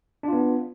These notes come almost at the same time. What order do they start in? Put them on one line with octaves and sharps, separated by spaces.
D4 F4 B3